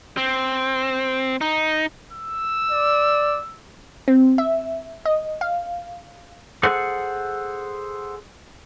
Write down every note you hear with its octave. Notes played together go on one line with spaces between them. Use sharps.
C4
D#4
E6
D5
C4
E5
D#5
F5
G#4 A4 C5 F#5